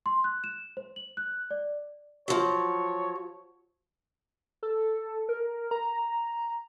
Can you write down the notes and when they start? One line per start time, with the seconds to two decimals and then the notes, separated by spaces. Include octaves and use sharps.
0.06 C6
0.24 F#6
0.44 E7
0.77 C5
0.96 F#7
1.17 F#6
1.51 D5
2.28 F3 F#3 C#5
4.63 A4
5.29 A#4
5.71 A#5